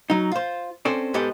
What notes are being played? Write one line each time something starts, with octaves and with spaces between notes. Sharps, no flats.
F#3 D#4
F4 C5
C4 C#4 A4 C5 D5
G#2 B3 G4 A4 D#5